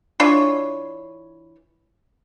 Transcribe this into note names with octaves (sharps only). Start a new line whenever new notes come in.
E3 D4 F4 C#5